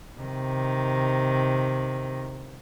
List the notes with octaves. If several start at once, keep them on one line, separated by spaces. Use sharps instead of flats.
C3 D#3